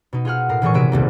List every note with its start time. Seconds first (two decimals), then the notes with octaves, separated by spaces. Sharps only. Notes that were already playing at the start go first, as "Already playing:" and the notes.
0.13 B2 D#4
0.25 F4 G#4 F#5 F6
0.49 A2 A#4 C7
0.62 G#1 A#2 E3 G#3 G#4 C#6
0.74 C3 B3 F#4 G#4 E5 D7
0.92 D#1 C2 A#3